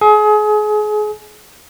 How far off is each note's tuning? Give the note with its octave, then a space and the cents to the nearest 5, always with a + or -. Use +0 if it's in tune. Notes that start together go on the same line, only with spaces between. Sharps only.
G#4 +30